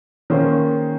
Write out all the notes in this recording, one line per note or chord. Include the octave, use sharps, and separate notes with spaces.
D#3 A#3 C#4 G#4 C5